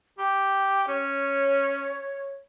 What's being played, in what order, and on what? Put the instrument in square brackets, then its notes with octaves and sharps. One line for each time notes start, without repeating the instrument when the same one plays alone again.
[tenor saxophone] G4 [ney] G5
[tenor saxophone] C#4 [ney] C#5